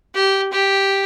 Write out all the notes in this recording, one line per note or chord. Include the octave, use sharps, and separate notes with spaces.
G4
G4